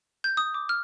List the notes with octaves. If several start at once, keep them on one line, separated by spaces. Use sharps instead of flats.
G6
D#6
D6
F6